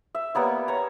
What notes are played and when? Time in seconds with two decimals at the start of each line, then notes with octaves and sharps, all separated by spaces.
0.15 E5
0.35 G3 A#3 B3 C#5
0.68 C#5 A#5